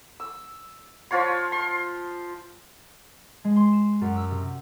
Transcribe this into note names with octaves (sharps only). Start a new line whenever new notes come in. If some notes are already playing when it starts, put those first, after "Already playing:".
E6
F3 F4 C#5 C6
C6
G#3
C6
E7
F#2
E6
C3